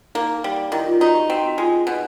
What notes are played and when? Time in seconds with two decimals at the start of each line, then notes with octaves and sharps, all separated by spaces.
0.15 A#3 D#4
0.44 G3
0.72 D#3 E4
0.87 F4
1.00 D#4 F#4
1.15 G4
1.29 C4 F#4
1.47 F#4
1.58 G#3 F4
1.87 B2 D#4